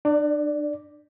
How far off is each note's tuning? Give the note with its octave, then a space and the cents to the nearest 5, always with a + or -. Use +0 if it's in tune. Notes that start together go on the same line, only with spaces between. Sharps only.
D4 +35 D5 +0